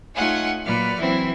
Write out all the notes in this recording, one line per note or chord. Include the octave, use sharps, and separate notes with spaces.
A3 D#4 F4 C#5 F#5 G#5
A#2 F#3 B4 D5 F6
E3 F#3 C4 E4